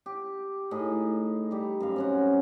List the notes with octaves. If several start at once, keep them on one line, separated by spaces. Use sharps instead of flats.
G4
A2 D#4 G#4 D#5
G3 G4
F#2 F5
C4 C#4 F#4